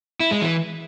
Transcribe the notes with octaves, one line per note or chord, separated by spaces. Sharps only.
E4
G#3
E3